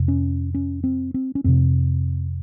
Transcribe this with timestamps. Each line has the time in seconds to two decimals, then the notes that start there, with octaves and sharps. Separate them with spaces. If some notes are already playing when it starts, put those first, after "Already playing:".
Already playing: F2 C3
0.08 C#4
0.54 C#4
0.84 C4
1.14 C4
1.35 C#4
1.44 F2 C3 C4